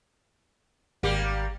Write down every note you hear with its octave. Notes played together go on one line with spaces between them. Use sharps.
G#1 G3 A#3 G4